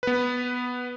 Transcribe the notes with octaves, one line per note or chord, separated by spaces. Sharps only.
B3 B4